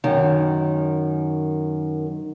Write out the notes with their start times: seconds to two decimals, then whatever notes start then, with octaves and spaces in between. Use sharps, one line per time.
0.04 F#2 D#3